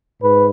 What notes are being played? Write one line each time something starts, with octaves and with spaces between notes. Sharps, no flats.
G#2 B4